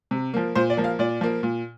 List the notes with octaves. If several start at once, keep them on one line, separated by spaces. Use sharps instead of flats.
C3
F3 A#3
A#2 C5
D5
F3 A#3
F5
A#2 D5
F3 A#3
A#2